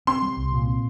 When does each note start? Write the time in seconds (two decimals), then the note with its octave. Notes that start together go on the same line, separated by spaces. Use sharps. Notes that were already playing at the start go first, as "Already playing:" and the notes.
0.07 C4 C6
0.22 G3
0.37 C2
0.52 A#2
0.67 C4